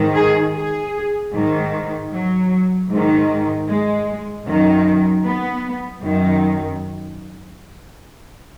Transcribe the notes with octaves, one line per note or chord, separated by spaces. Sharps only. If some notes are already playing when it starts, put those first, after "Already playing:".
Already playing: G#2 D#3
G#4
G#4
G#2 D#3
F#3
G#2 D#3
G#3
F#2 D#3
B3
F#2 D#3